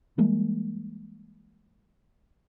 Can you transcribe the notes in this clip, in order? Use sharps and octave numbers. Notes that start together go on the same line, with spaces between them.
E3 G3 G#3 A#3